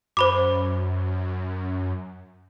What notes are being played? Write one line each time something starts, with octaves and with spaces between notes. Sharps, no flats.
F#2 C5 B5 D6